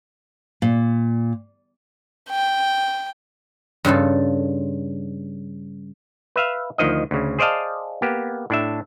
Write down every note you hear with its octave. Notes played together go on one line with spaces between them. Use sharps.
A#2
G5
G2 C#3 F4 A4
B4 E5 F5
D2 D#3 F3 D#5
D2 C#3
G#4 C5 D5 D#5 F5 A5
A#3 B3 G4
A2 D4 E5